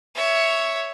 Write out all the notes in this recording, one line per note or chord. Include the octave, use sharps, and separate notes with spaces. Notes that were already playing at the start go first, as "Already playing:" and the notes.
C#5 E5